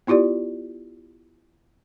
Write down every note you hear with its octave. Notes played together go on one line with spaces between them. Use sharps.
B3 E4 F4 G4 D5